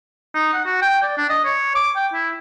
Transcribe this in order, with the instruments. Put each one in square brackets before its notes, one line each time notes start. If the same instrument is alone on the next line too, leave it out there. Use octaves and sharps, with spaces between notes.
[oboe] D#4
F#5
F#4
G5
D5
D4
D#5
C#5
D6
G5
E4